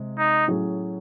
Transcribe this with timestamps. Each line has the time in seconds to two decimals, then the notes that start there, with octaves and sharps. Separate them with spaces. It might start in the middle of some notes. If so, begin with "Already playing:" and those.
Already playing: C3 G#3
0.19 D#4
0.48 A2 F#3 C#4 G#4